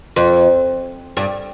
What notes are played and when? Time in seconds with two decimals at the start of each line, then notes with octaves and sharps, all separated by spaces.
0.16 F2
1.17 G2